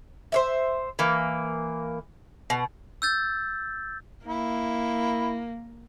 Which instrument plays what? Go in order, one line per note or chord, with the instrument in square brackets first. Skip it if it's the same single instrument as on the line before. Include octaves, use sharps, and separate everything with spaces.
[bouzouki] C5 C#5 E5
E3 A#3
B2
[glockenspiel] E6 G6 A6
[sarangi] A#3 [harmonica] E4